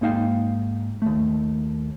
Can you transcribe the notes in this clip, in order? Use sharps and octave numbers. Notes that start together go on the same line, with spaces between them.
G#2 A#3 D#4 F5 G5
D#2 A3